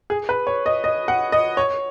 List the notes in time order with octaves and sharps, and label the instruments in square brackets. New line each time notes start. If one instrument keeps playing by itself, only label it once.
[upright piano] G#4
B4
C#5
D#5
D#5
F#5
D#5
C#5